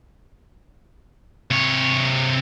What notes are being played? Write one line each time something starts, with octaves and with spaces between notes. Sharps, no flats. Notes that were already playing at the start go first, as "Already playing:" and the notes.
C3 C#5